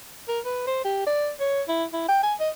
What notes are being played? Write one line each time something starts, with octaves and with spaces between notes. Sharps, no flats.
A#4
B4
C5
G4
D5
C#5
E4
E4
G5
G#5
D#5